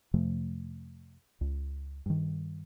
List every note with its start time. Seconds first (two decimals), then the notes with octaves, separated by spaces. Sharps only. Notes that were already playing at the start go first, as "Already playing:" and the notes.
0.14 F2 C3 F3 A3
1.41 C#2
2.06 G2 D#3